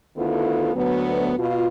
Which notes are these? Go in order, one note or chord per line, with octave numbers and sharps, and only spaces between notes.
D2 D#3 B3 E4 F4 A4
D2 F#3 B3
B2 F4